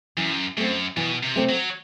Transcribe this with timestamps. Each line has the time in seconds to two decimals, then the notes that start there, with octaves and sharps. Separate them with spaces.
0.17 F#2 E3
0.57 F#2 A3 C4
0.97 B2 E3
1.23 C3
1.36 A3 C4
1.49 F#3